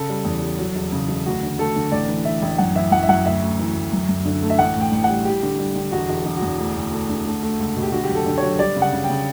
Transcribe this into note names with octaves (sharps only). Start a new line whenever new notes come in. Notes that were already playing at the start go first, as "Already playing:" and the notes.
Already playing: C#3 A4
G3
E2
G3
F#3
E1
C#3
E1
D2 F#4
D3
A3 A4
D3
A1 D5
E3
E3 E5
A1
F#2 F#5
E3 E5
F#2 F#5
E5
F#2 F#5
D2 E5
D2
E3
D2
F#2
F#2
D3
A3
E5
A1 F#5
A2 G5
A1
F#5
G3
G3 G4
D3
G3
D3
E1 F#4
E1
E1
F#4
E2
D2
D2
A3
D3
A3
A3
C#2
B2
G4
D3 F#4
G4
F#1
A4
D3
F#3 C#5
G3 D5
C#3
F#5
C#3
G5
C#3